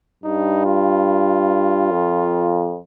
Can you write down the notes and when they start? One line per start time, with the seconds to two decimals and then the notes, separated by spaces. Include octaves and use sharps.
0.24 G2 D#4
0.65 F4
1.91 F2